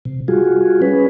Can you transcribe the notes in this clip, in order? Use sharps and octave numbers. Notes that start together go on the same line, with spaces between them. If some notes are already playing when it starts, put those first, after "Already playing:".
C3
G3 F4 F#4 G#4
C#4 G#4 B4